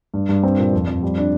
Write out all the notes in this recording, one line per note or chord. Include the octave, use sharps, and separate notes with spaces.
G2
G2
C4
A#2
F2
F2
G3
D4